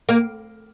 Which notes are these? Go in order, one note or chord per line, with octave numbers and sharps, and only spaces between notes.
A#3